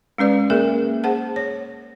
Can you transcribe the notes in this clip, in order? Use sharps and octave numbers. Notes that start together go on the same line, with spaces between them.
G#3 C#4 B4 D5
A#3 G#4 A#4 E5
G#4 C5 F#5 A5
C#5